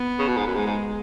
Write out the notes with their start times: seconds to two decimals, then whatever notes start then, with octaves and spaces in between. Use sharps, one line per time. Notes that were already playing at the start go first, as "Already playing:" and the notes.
Already playing: B3
0.19 C#3
0.28 B2
0.37 G#2
0.46 F#2
0.55 G#2 G#3
0.66 G#2